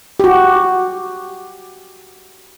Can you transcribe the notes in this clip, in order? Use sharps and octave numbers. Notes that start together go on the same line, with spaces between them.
F#4 G4